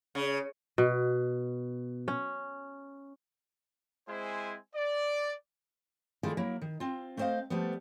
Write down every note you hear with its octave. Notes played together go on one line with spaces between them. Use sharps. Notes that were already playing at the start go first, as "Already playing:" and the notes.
C#3
B2
C#4
G#3 C4 E4 C5 G#5
D5
D#3 A3 E4 F4 G#4 D5
F#3 A#3 E4
D#3
C4 F4
A3 B3 C4 C5 D#5 F5
F3 G3 A3 B3